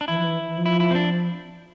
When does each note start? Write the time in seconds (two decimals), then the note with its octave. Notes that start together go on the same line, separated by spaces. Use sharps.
0.01 D4
0.08 E3 E4
0.17 F3
0.23 E3
0.47 E3
0.57 F3
0.66 E4
0.80 E4
0.91 C4
0.95 D4